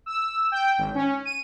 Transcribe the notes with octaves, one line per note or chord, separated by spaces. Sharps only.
E6
G5
G#1
C#4
D#7